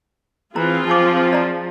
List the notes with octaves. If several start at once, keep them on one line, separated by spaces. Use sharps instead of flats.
E3 C4 F4 G#4 A#5
F3 G#5 A5 D6
D5 A#5